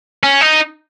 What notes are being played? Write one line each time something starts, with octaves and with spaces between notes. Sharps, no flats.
C#4
D#4